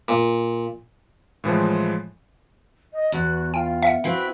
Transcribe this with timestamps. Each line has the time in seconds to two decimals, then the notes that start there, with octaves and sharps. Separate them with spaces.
0.08 A#2
1.44 A2 E3 F3 G#3
2.93 D#5
3.12 E2 F#4
3.54 F4 G5
3.83 E5 F#5
4.04 C4 E4 F#4 B4 F5